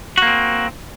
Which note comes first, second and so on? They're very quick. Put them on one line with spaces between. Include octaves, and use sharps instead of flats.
F#4 A#3 C4